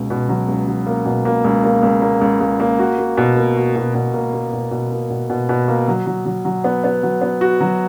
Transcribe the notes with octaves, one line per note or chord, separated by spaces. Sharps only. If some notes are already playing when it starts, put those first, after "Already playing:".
Already playing: C#2 B2
B2
F#3
C#2
F#3
A#3
B2
A#3
C#2
A#3
C#2
A#3
C#2
C#2
A#3
F#4
A#3
B2
A#3
F#4
B2
B2
A#3
A#3
B2
B2
A#3
B2
B2
B2
A#3
F#3
F#3
F#3
F#3
B3
B3
F#3
B3
F#4
F#3